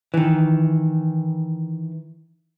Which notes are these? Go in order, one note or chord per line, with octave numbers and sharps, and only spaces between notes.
D#3 E3